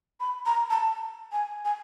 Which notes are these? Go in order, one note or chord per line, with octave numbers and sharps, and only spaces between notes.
B5
A#5
A5
G#5
G#5